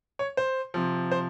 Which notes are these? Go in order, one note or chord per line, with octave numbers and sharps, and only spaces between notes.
C#5
C5
C3 F3
C5